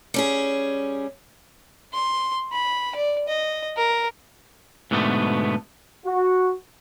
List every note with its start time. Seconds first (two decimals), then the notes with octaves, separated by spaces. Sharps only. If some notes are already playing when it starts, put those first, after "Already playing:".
0.14 G3 C#4 G#4
1.93 C6
2.52 B5
2.95 D5
3.28 D#5
3.77 A#4
4.91 G#2 B2 D3 A3 B3
6.06 F#4